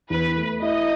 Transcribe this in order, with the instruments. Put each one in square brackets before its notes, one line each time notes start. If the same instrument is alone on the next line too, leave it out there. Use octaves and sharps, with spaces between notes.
[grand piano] E2 [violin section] B4
[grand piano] A3
[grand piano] E4 [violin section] D#5